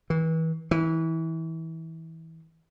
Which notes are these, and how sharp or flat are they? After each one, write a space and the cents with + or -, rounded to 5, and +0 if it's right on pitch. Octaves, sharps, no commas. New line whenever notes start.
E3 -35
E3 -25